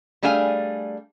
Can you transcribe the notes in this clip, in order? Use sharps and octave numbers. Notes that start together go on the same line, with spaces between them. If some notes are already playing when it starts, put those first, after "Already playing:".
G3 A3 D4 G#4 F5 G#5